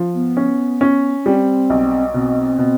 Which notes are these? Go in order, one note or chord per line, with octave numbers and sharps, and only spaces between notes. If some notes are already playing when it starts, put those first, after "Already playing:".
Already playing: F3
B3
C#4
C#4
G3 C4
B1
B2 C4
B2